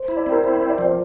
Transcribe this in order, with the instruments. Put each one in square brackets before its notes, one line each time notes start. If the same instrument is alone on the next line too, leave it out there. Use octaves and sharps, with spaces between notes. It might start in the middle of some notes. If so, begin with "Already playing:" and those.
Already playing: [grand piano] C5
[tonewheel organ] E4
[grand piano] D5
[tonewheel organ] C4
[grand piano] A#4
[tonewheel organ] E4 [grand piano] C5
[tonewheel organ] C4
[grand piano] D5
[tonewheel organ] F3
[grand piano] D5